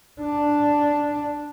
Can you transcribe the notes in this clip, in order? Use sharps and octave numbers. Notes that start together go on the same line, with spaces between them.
D4